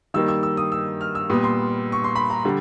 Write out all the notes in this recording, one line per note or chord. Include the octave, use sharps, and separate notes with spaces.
D#3 G3 A#3 E6
E6
E6
D#6
E6
F6
E6
A#2 G3 B3 D#6
C6
C#6
C6
B5
A#5
D3 G3